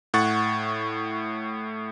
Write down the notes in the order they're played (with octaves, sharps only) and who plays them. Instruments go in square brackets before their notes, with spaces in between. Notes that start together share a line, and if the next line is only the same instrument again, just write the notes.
[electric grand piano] A2 F#5 C#6 A6